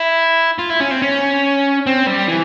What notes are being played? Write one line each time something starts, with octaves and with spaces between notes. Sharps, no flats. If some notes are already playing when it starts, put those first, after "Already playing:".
Already playing: E4
F4
E4
C#4
C4
C#4
C4
G3
E3